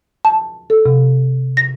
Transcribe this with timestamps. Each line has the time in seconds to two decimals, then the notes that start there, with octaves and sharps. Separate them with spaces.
0.25 A5
0.70 A4
0.86 C3
1.57 A#6